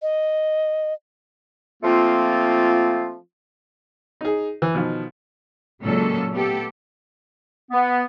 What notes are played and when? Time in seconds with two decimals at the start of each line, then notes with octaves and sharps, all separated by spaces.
0.02 D#5
1.83 F3 A3 A#3 C4 F4
4.21 D#4 G#4
4.62 E3
4.75 B2 D#3 F3
5.82 A#2 C#3 F#3 G#3 C#4 A4
6.32 A3 B3 G4 A4
7.71 B3